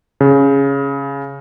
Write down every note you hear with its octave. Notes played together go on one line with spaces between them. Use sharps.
C#3